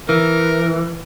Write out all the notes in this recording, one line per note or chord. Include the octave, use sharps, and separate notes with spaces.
E3 A#4